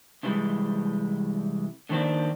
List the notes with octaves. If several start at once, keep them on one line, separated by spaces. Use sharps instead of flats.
C3 E3 G3 G#3
D3 D#3 F3 A#3 C4 D4